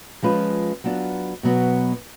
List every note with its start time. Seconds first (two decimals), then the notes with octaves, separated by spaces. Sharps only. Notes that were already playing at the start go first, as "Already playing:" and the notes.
0.23 F3 G#3 C#4 F4 B4
0.84 F#3 B3 D4 F4
1.43 B2 F#3 B3